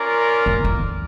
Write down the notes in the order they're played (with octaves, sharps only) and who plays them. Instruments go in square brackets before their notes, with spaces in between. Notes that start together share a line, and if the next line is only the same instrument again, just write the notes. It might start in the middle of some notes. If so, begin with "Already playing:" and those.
Already playing: [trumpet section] C#4 F4 A#4 D5
[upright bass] F2
F2